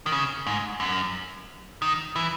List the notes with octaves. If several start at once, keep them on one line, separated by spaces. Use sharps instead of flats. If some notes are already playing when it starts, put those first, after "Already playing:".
D#3
C#3
G#2
F#2
D#3
E3